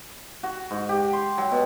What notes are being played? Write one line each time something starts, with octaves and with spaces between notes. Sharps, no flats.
F#4
G#2
G4
C6
F#3
B2